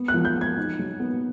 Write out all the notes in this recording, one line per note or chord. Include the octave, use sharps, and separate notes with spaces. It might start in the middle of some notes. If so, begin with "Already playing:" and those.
Already playing: B3
F#6
F3
G6
G#3
G#6
D#4
F#3
B3